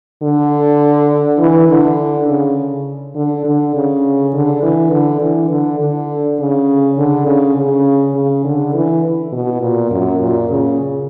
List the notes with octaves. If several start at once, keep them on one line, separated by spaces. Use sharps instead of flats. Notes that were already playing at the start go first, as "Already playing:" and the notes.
D3
E3
D3
C#3
D3
D3
C#3
D3
E3
D3
E3
D3
D3
C#3
D3
C#3
C#3
C#3
D3
E3
B2
A#2
F#2
A#2
C#3